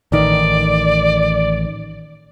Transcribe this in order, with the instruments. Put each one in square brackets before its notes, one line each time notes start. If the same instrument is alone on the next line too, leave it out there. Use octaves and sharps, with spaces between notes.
[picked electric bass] A1 D#3 [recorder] D5